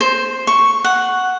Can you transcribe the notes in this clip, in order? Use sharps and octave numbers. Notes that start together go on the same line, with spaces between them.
C5
C#6
F#5